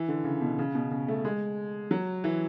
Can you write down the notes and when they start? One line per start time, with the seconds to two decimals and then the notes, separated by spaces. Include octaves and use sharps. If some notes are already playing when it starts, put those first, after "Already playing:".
Already playing: E3
0.08 D3
0.24 C#3
0.41 B2
0.59 C#3
0.75 B2
0.91 C#3
1.08 A3
1.25 G#3
1.91 F#3
2.24 E3